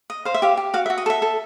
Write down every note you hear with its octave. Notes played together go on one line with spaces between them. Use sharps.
D#5
C5 F5
E5
G4 F5
G4
F#4 F5
E5
F#4
D#5
A4 E5
A4